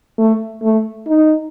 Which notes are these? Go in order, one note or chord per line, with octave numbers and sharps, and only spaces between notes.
A3
A3
D#4